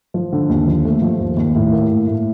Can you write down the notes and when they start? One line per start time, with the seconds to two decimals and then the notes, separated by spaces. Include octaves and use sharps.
0.14 F3
0.33 D3
0.49 D#2
0.67 F3
0.85 A3
1.02 F3
1.19 D#2
1.37 D#2
1.55 A2
1.72 A#3
1.89 A2
2.07 A2